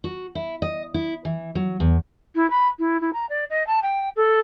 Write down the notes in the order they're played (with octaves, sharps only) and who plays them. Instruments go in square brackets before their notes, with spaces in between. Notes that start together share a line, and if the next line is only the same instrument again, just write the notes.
[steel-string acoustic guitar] F#4
E4
D#5
E4
E3
F#3
E2
[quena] E4
B5
E4
E4
A#5
D5
D#5
A5
G5
A4